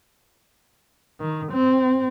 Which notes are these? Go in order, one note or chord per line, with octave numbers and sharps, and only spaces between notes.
D#3
C4